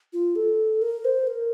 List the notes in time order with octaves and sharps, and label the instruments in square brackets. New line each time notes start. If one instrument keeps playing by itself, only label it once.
[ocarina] F4
A4
A#4
C5
A#4